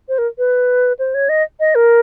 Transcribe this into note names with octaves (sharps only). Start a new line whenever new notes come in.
C5
A#4
B4
C5
C#5
D#5
D#5
A#4